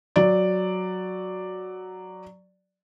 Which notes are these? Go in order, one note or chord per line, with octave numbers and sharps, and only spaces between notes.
F#3 D5